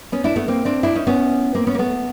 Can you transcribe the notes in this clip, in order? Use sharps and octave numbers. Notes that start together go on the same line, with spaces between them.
B3 C#4
D4 E4
A3 B3
A#3 C4
C4 D4
D4 E4
C#4 D#4
B3 C#4
A#3 C4
B3 C#4
A#3
A3 B3